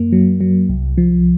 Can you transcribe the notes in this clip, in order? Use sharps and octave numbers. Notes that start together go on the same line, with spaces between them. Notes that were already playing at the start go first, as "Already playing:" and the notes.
Already playing: F#2 A#3
F#3
F#3
C2
F3